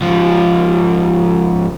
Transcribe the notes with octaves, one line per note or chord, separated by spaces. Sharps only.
C#2 F3